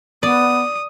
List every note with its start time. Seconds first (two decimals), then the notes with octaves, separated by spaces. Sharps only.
0.23 B3 D5 D#6